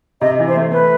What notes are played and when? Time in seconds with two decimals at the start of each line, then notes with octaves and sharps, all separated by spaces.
0.21 C3 D#5
0.39 E3
0.48 C5
0.55 A3
0.72 A3 B4